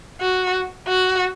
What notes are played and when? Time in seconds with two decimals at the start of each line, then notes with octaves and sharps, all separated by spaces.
0.21 F#4
0.88 F#4